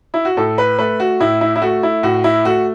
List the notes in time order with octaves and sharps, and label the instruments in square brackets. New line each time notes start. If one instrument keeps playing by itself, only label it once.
[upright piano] E4
F#4
A2 A4
B4
A3 B4
F#4
A2 E4
E4
E4
A3 F#4
E4
A2 F#4
E4
A3 F#4